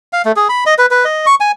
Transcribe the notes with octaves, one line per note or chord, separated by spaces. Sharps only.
F5
A3
G#4
B5
D#5
B4
B4
D#5
C#6
G#5